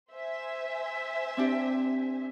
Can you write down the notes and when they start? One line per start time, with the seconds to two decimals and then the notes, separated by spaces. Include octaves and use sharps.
0.12 C5 E5 G#5
1.37 C4 D4 G4